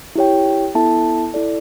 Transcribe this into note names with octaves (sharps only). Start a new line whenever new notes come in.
E4 G4 C#5 G5
B3 E4 A4 E5 A5
E4 A4 D5